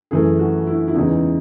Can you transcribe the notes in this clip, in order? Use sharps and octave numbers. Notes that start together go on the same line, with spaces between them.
F#2 E3 A3 G#4
F#4
E4
E4
E2 C#3 E3 G#3 D#4